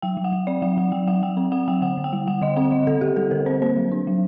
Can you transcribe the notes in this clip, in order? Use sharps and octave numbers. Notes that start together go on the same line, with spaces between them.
F#3 G5
F#3
F#5
F#3
C4 D5
F#3 F#5
F#3 F#5
F#3 G5
F#3 F#5
F#3 G5
C4
C4 F#5
F#3 G5
D3 F#5
D3
G5
G3
G3 F#5
D3 D#5
C4 F#5
D3 D#5
D3 A4
D3 G4
G3 A4
D3 A#4
C4 C5
A#3 C5
F#3
D4
F#3